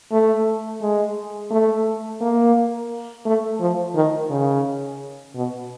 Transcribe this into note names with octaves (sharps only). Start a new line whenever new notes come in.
A3
G#3
A3
A#3
A3
F3
D#3
C#3
B2